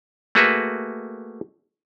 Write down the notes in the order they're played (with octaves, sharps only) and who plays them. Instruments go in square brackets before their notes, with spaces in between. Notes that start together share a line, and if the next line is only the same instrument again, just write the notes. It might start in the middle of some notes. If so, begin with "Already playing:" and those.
[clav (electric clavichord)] A3 A#3 F#4 G#4 B4 E5